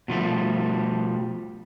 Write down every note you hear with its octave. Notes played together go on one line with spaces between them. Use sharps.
B2 F3 G3 A3